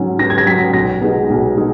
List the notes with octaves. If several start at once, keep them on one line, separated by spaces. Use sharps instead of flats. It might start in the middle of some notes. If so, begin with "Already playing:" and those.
Already playing: G#2 F#3 C#4
G#2 A#6
G#6
A#6
F#3 C#4 B6
B1 A#6
B2 G#3 D#4
B1
G#3 D#4